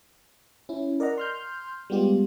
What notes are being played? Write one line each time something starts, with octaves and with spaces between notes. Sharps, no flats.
C#4 E4
A#4 D5 D#5 F#5 A#5
C6 F6 G6
G3 G#3 B3 F4 G4